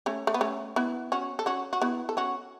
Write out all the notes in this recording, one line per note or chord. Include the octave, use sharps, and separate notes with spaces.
A3 C#4
A3
B3
A3 C#4
B3 E4
C#4 F#4
A4
C#4 F#4
F#4
B3 E4
A4
C#4 F#4